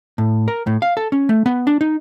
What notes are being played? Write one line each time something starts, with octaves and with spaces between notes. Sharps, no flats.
A2
A#4
A2
F5
A4
C#4
A3
B3
D4
D#4